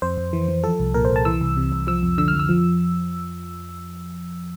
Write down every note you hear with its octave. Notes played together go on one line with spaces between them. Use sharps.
F2 C5
F2
E3
E3
F3 A4
C2
A#2 A#4
C5
C2
A5
E3 E6
C2
C3
C2
F3 E6
F2
D3 E6
F6
F2
E6
F3